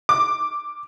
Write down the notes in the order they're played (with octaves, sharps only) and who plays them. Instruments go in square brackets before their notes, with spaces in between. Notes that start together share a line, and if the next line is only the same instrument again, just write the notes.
[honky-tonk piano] D6